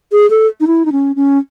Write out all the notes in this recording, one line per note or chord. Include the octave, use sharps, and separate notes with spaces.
G#4
A4
D#4
E4
D#4
C#4
C#4